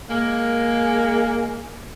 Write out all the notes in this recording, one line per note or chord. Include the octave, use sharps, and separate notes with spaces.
G#3 A#3